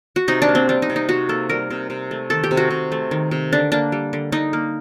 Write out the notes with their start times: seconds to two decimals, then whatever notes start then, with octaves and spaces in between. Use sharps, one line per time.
0.16 F#4
0.28 C3 D#4
0.42 D4
0.49 A#3
0.55 C4
0.69 G3 D4
0.82 D#4
0.90 C3
0.96 D#4
1.09 C3 F#4
1.29 A#3 A4
1.49 G3 A#4
1.70 C3
1.90 C3
2.11 A3
2.30 D#3 A4
2.44 G4
2.51 C3
2.57 F#4
2.70 C3
2.92 A3
3.11 D#3
3.31 C3
3.53 D3 D4
3.72 A#3 D4
3.92 G3
4.13 D3
4.32 D3 D#4
4.53 A#3